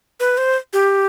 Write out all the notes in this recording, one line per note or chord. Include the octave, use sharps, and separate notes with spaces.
B4
C5
G4